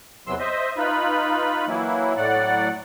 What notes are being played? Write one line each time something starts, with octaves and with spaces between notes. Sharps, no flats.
E2 C3 E3 F#3 C6 E6
C5 D#5 E5
D#4 F4 B4 B5
E3 F#3 A#3 E4
A2 F#3 D5 F#5